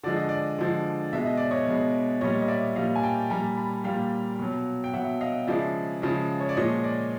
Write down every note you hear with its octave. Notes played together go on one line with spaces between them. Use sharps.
D3 F3 G#3 D5
D#5
D5
D3 F3 G#3
B2 G#3 E5
D#5
D5
C#5 D#5
B2 G#3
A#2 G3 C#5 D#5
D#5
D5 E5
A#2 G3 D#5 F5
G#5
G5 A5
A#2 G3 G#5 A#5
A5 B5
A#2 G3 F5 G5
B2 F#3
G5
B2 F#3 E5 F#5
D#5 F5
C#3 F3 G#3 D5 E5
C#3 F3 G#3
C#5
D5
A#2 F3 G#3 C#5 D#5
D5